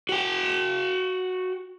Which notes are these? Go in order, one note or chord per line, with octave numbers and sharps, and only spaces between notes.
F#4 G5